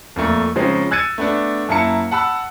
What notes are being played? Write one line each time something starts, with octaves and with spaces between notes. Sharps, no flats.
F2 A#2 A3 A#4
C#3 F3 G#3 C4 C#4 D#4
E6 F#6 G#6 A6 C#7 D#7
A3 B3 D4
F#2 A#3 E4 A5 C#7
F#5 A5 B5 E6 F#6